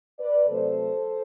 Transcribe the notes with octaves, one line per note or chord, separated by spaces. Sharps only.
B4 D5
C3 F#3 A3 A4 C5